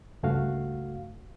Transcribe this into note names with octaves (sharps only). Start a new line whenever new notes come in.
C#2 G2 A3 F#4 F5